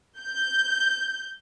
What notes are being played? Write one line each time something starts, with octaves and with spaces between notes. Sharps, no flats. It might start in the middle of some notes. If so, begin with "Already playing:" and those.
G6